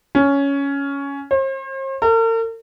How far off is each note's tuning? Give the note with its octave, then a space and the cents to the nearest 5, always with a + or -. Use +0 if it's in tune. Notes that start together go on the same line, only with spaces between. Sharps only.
C#4 +10
C5 +45
A#4 -45